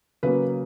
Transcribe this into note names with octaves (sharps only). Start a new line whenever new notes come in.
C#3 F#3 A#3 B4